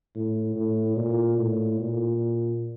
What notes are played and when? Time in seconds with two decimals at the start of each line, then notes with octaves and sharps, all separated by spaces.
0.15 A2
0.56 A2
0.97 A#2
1.38 A2
1.80 A#2